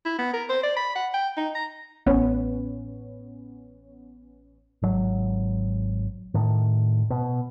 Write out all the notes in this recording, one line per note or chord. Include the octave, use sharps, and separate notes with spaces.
E4
B3
A#4
C5
D5
B5
F#5
G5
D#4
A#5
A1 B3 C#4
G#1 F#3
A2 D#3
B2